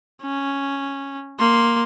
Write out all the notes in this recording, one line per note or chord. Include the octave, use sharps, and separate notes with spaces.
C#4
A#3 C6